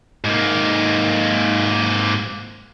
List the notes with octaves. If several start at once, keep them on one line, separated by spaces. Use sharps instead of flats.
G#2 A#3